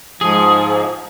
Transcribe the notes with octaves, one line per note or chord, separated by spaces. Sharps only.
G#2 F3 G#4